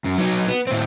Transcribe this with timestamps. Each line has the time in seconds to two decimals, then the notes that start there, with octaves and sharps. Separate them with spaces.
0.05 F#2
0.18 F#3 D#4
0.49 B3
0.67 A2 C4